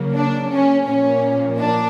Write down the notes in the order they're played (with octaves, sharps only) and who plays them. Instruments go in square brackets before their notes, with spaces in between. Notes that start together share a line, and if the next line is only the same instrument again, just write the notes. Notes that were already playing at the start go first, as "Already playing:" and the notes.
Already playing: [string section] C#3 F#3 A#3
D4
C#4
A#2 F3 A#3 C#4
D4